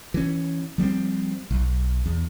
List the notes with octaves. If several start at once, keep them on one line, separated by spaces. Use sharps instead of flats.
E3 C#4
F3 G3 B3 C4
B1
E2